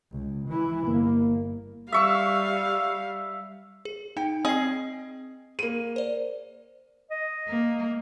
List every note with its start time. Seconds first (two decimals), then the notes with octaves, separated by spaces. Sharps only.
0.12 C#2
0.49 E3 E4
0.88 G1 A#3
1.92 G3 E5 F5 C#6 E6
3.85 G#4
4.17 D#4 G5
4.45 C4 G#4 D#5 C7
5.59 A#3 G#4 D#7
5.96 C5 D5
7.11 D#5
7.48 A#3